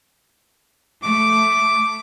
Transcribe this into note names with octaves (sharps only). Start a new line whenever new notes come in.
A3 D6